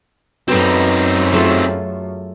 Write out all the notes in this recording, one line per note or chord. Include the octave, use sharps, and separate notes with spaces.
F#2 B3 C4 D#4 F#4 A4 D5
F#3 A3 F4 G#4 A4 C#5